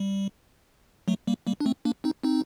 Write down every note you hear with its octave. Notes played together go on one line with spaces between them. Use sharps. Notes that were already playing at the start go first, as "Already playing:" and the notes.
Already playing: G3
F#3 A3
G3 A#3
G3 A#3
D4
A3 C4
A#3 D4
C4 D#4
C4 D#4